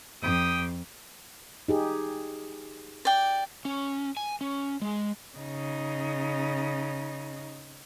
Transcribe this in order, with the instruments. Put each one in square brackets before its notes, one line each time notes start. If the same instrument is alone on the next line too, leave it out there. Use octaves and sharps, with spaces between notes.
[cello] F2 [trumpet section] G4 G5 D#6
[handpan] D#4 G4 G#4
[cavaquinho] D5 G5
[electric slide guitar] C#4
G#5
C#4
G#3
[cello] C#3 D#4